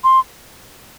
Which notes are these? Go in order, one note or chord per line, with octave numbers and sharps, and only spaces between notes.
C6